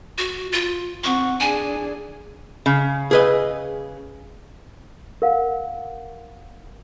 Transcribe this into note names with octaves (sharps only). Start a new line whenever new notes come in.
F#4
F4
C4 F#5 C#6
D4 G#4 G#5
C#3
G#4 B4 D#5
A#4 F5 F#5